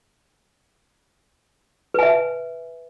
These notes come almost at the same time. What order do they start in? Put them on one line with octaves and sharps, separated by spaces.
B4 G#5 E5